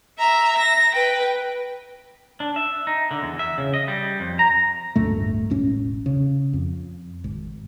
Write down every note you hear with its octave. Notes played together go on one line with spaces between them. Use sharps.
E5 A#5
A#6
B4 G5
D4
E5
D#4
D3
E2
E5
C#3
D#5
G3
F2
A#5
D1 D2 G2 A3
E1 A1 C#4
C#3
F2
G#1